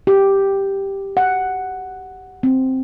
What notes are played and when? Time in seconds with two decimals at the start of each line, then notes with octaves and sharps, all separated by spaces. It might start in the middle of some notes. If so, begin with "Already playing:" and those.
0.07 G4
1.17 F#5
2.43 C4